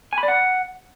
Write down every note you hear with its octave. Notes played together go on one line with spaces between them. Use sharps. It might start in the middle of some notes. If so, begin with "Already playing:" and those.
G#5
B5
D5
F#5